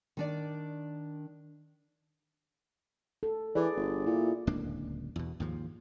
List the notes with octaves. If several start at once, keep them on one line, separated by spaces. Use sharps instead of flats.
D#3 D4 D5
A4
E3 G#4 D5
G1
A#2 E4
D1 C#2 A#3 D4
E2 B2
D#2 G#2 F3